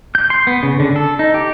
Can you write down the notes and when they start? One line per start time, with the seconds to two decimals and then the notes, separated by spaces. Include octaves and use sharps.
0.15 G6
0.30 C6
0.47 B3
0.63 C#3
0.80 D3
0.96 A4
1.19 D#4
1.34 G4